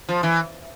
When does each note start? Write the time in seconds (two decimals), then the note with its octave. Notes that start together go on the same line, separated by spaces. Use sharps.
0.09 F3
0.23 E3